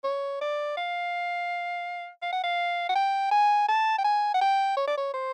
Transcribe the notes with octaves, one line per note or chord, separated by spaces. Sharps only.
C#5
D5
F5
F5
F#5
F5
F#5
G5
G#5
A5
G5
G#5
F#5
G5
C#5
D5
C#5
C5